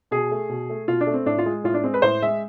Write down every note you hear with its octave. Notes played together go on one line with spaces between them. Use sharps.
B2 G#4
A3
B2
A3
B2 F4
D4
A3
C4
A2 D4
F4
G#3
A2 F4
D4
G#3 C4
B4
A2 C5
G#3 E5